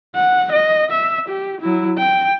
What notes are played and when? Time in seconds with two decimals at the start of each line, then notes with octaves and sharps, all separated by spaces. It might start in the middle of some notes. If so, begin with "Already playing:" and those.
0.15 F#5
0.52 D#5
0.91 E5
1.29 G4
1.61 F#3 E4
1.98 G5